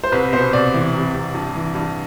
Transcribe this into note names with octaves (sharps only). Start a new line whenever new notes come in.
C5
C2 B4
B2 C5
C2 D5
E3
C3
C2
G2
E3
G2